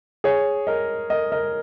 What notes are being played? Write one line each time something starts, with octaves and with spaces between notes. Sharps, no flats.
G#4 C#5
A#4 D#5
A#4 D#5
A#4 D#5